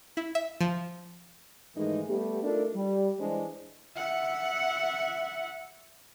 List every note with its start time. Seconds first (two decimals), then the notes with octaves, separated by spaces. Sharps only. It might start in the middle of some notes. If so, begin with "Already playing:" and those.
0.17 E4
0.35 E5
0.61 F3
1.76 G#2 D#3 E3 G#3 A3 D#4
2.09 G3 A3 B3 G4
2.44 A3 D4 D#4 F4 A4 A#4
2.75 G3
3.20 E3 G#3 D4 E4 C5
3.97 E5 F#5